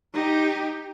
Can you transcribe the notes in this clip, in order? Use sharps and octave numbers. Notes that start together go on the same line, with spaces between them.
D#4 G4